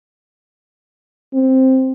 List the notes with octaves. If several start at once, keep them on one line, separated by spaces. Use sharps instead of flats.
C4